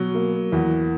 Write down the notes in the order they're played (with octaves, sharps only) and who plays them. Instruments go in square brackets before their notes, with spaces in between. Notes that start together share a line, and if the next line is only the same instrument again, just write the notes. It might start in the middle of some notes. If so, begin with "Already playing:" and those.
Already playing: [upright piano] B2 F#3
A#3
E2